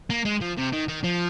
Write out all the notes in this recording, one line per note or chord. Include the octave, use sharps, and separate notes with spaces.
A#3
G#3
F3
C3
D#3
D#3
F3